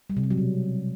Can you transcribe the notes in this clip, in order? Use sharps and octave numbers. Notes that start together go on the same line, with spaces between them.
G3
C3
G3
F#3
B2